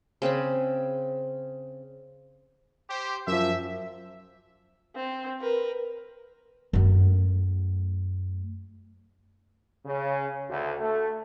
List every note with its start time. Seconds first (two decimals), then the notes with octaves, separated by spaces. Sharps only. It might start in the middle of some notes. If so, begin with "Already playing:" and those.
0.22 C#3 C4 C5 B5
2.90 G4 C5
3.27 F#2 F3 E5
4.96 C4
5.41 A#4 B4
6.73 F#2 A3
9.85 C#3
10.49 D2
10.80 A3